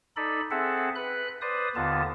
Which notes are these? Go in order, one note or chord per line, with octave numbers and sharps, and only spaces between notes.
D#4 A4 D5 B5
C4 G#4 A4 E5 F#5
B4 B5 F#6
B4 C5 D5 D#6
D#2 D3 B3 F4 A5